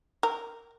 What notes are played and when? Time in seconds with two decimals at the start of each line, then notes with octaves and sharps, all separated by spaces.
0.23 A#4